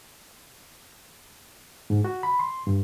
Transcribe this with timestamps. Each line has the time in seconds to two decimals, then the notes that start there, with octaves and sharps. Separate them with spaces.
1.90 G#2
2.04 F#4
2.23 B5
2.39 C6
2.67 G2